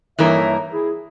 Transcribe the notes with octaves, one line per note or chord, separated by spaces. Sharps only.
G2 E3 A#3 D#4 A#4 C#5 E5
E4 G#4